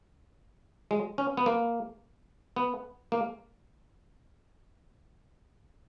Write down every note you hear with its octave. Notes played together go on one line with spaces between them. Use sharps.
G#3
C#4
B3
A#3
B3
A#3